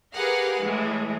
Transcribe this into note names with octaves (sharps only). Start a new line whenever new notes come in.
G4 G#4 A#4 B4 F5 F#5
A2 E3 G#3